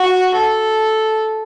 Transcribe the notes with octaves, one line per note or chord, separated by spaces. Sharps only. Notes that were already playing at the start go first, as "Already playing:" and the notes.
Already playing: F#4
A4